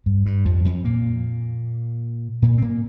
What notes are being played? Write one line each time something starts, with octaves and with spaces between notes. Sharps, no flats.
G2
G2
F2 F3
F2 F3
A#2 A#3
A#2 A#3
C4
A#2 A#3